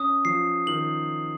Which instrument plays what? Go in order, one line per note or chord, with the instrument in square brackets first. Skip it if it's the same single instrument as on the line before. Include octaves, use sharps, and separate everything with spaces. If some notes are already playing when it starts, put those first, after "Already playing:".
Already playing: [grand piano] C#4 [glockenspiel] D#6
[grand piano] F3 [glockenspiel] C7
[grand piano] D#3 [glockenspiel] F#7